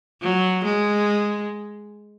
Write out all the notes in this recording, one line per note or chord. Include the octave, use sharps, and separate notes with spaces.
F#3
G#3